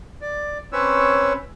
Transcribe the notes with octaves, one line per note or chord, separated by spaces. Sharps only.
D5
C4 C#4 B4 C#5 E6